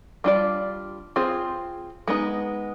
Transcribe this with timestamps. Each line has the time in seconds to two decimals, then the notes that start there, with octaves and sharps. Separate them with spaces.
0.24 G3 D4 F4 G#4 D5
1.16 C4 F4 G#4 C5
2.07 G#3 B3 D#4